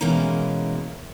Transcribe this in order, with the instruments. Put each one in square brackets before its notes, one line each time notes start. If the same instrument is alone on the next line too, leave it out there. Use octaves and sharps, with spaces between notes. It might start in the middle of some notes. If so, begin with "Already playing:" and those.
[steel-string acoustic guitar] B2 E3 G#3 A#3 C#4 A#5